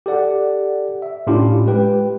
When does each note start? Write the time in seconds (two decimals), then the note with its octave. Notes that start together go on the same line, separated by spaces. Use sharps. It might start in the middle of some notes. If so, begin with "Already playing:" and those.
0.06 G4 A4 D5 F#5
1.02 E5
1.27 A2 C#4 D4 E4 F4 G4
1.66 G#3 G4 B4 G5